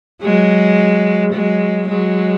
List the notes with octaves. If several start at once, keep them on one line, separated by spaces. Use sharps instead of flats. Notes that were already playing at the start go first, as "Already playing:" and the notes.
F#3 G#3
F#3 G#3
F#3 G#3